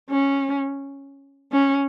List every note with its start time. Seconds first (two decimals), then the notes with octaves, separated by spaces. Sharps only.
0.10 C#4
1.52 C#4